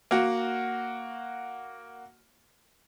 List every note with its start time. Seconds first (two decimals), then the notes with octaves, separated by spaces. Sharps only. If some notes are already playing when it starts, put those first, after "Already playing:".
0.11 A#3 F#4